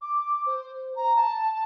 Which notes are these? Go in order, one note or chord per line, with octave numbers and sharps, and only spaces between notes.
D6
C5
A#5
A5